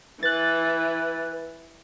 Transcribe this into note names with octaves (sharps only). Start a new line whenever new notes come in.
E3 B4 F#6 A6